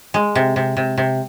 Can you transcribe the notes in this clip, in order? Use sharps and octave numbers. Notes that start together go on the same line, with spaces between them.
G#3
C3
C3
C3
C3